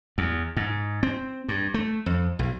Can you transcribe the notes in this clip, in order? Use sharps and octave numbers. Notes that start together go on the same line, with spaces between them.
E2
G#2
C4
G2
A3
F2
B1